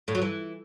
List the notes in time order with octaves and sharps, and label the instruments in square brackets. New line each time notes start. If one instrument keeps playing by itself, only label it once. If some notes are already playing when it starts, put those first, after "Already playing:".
[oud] A2
F#3
E3